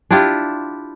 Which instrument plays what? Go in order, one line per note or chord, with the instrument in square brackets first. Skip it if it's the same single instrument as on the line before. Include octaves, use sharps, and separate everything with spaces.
[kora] D4 E4 F4 G4